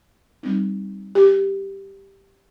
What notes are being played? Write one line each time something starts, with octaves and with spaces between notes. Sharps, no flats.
G3 C4 D#4
G4